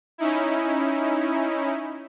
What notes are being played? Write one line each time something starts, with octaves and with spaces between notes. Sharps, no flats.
C#4 D#4 E4